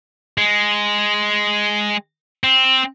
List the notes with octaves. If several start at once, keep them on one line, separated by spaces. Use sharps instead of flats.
G#3
C4